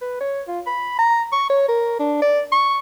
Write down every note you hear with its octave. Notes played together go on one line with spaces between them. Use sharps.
B4
C#5
F4
B5
A#5
C#6
C#5
A#4
D4
D5
C#6